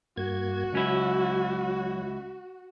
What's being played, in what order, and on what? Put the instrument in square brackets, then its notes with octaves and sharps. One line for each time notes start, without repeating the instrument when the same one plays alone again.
[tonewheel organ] G2 A#3 G#6 [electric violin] F#4
[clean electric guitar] C#2 C#4 E4 [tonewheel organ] F#3